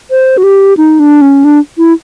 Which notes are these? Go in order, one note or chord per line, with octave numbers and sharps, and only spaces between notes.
C5
F#4
G4
D#4
D4
C#4
D4
E4